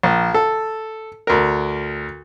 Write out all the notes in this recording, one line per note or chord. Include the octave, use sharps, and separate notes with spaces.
A#1
A4
D2 A#4